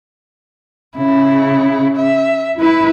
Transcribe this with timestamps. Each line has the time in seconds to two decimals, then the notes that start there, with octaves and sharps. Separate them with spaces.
0.97 C#3 E4
1.96 E5
2.61 E4 B4